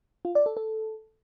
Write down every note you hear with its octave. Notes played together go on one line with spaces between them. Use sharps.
F4
D5
A4
A4